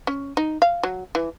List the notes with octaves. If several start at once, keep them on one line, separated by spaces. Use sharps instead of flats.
C#4
D#4
F5
F#3
E3